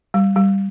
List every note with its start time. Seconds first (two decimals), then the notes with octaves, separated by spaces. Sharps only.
0.14 G3
0.36 G3